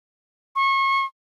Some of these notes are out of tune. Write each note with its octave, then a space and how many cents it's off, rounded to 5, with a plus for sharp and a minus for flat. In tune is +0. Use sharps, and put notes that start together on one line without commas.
C#6 -30